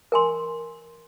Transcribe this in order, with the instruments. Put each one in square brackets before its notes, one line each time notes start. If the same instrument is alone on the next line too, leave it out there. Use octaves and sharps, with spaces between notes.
[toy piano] A#4 G#5 C6